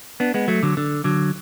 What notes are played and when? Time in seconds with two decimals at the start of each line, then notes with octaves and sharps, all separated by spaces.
0.20 B3 D4
0.34 G#3 B3
0.48 F#3 A3
0.63 D3 F#3
0.77 D3
1.04 D3 F#3